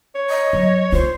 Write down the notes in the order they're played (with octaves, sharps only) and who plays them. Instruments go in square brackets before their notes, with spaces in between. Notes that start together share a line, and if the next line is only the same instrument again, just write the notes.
[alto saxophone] C#5
[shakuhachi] D#5
[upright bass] F#3
[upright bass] F4 [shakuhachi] C5